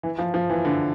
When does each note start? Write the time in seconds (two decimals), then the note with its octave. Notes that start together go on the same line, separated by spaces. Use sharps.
0.03 E3
0.19 F3
0.34 F3
0.50 E3
0.65 D3